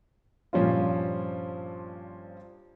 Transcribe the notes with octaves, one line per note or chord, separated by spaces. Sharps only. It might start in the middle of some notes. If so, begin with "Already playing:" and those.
G2 A#2 F3 C#4 F4